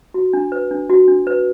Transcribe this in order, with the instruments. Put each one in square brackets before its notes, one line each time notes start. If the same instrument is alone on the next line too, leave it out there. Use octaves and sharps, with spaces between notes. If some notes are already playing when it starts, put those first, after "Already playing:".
[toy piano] F#4
D4
B4
D4
F#4
D4
B4